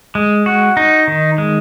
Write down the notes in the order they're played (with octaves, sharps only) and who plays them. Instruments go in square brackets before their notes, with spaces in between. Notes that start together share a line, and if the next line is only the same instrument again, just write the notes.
[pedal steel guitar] G#3
F#4
D#4
D#3
G#3